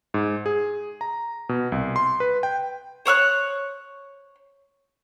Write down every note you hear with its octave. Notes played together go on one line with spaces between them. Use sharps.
G#2
G#4
A#5
B2
C2
C6
B4
G5
C5 C#5 E6 F#6